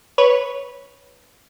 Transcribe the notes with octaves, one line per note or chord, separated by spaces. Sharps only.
B4 C#5